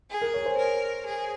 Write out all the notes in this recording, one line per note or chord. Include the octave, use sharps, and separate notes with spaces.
G#4
A#4
C#5
C5
A#4
G#4